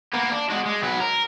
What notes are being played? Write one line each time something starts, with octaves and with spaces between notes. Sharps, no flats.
A#3 B3
D4
G#3 F#4
G#3
F#3 B4
A#4